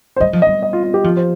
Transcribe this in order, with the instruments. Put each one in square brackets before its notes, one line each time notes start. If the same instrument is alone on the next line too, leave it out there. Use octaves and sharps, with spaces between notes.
[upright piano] C5
[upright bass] G3 [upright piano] D#5
[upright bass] F3
[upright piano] D#5
[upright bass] G3
[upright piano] D#5
F4
F4
G4
[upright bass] F3 [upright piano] F4
[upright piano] C5